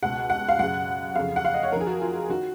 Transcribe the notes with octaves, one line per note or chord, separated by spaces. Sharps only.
C#2 B2 F#5
F#5
F5
F#2 C#3 F#5
F2 C#3 F5
F#5
F5
D#5
C#5
F2 D#3 A#4
G#4
F#4
F4
D#3 F#4